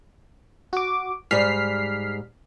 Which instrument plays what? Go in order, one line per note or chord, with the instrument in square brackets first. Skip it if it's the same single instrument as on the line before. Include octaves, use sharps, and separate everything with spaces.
[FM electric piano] F#4 D6
[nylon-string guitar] G#2 G3 [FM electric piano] F6 B6 C7